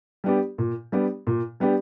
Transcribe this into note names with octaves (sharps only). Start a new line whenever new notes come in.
G3 B3 D4 G4
A#2
G3 B3 D4 G4
A#2
G3 B3 D4 G4